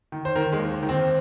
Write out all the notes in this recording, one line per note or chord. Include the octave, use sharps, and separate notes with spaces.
D#3
C5
D#3 A#4
G#3
D#2
D#3
C4